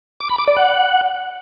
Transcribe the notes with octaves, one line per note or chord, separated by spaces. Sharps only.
D6
B5
D6
D5
F#5